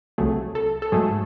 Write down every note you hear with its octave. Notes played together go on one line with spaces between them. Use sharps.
C2 C3 F#3 A3 G#4
A4
A4
G#2 F#3 A3 G#4